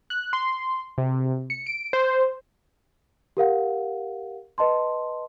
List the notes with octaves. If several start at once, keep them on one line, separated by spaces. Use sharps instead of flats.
F#6
C6
C3
C#7
D7
C5
G4 A#4 F5 F#5
B4 D#5 A5 C6